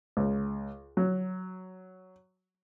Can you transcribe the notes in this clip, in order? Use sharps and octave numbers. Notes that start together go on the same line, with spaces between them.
C#2
F#3